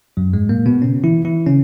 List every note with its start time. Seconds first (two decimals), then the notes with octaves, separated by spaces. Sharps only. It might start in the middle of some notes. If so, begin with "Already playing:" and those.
0.17 F#2 F#3
0.33 G#2 G#3
0.49 A#2 A#3
0.66 B2 B3
0.82 C#3 C#4
1.04 E3 E4
1.25 E3 E4
1.46 C#3 C#4